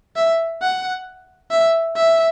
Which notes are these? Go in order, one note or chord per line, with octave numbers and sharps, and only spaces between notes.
E5
F#5
E5
E5